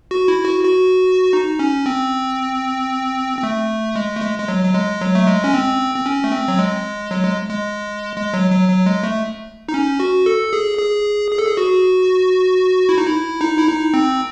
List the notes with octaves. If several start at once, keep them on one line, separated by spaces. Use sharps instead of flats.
F#4
E4
F#4
F#4
D#4
C#4
C4
C4
A3
G#3
A3
G#3
G#3
F#3
F#3
G#3
F#3
A3
G#3
C#4
C4
C4
C#4
A3
C4
F#3
G#3
F#3
G#3
G#3
G#3
F#3
F#3
F#3
G#3
A3
D#4
C#4
F#4
A4
G#4
G#4
G#4
A4
G#4
F#4
E4
D#4
E4
D#4
E4
D#4
C4